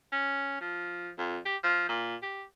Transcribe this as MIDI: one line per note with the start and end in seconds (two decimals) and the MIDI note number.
0.12 0.57 61
0.60 1.10 53
1.18 1.38 41
1.45 1.56 67
1.63 1.86 53
1.89 2.15 46
2.22 2.44 67